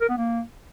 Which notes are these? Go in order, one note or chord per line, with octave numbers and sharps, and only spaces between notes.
A#4
B3
A#3